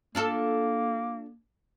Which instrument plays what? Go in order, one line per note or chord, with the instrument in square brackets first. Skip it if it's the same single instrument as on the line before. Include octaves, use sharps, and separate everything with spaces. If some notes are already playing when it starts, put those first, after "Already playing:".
[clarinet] A#3 [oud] D4 F4 A4